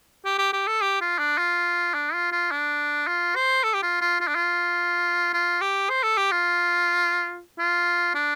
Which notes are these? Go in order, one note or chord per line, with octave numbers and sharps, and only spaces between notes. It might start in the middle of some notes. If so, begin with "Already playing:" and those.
G4
G4
G4
A4
G4
F4
D4
F4
D4
F4
F4
D4
F4
C5
A4
G4
F4
F4
F4
D4
F4
F4
G4
C5
A4
G4
F4
F4
D4